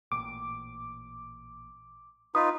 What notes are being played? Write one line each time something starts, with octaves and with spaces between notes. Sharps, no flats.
A1 A#2 D6
D#4 F4 B4 D#6